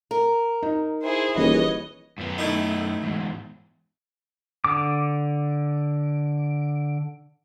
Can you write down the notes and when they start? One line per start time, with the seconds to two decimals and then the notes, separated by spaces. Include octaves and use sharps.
0.11 A#4
0.63 D#4
1.04 E4 G#4 C5
1.37 D#1 E3 G#4 B4 C#5 D#5
2.18 F#2 B3
2.38 A3 D#4 E4
3.03 E2 G#2
4.64 D3 D6